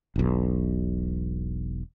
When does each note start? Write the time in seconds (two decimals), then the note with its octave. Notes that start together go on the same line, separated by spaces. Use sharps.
0.16 E1 B1